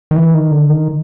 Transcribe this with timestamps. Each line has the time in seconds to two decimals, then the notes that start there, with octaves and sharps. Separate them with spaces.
0.11 D#3
0.16 E3
0.34 D#3
0.51 D3
0.69 D#3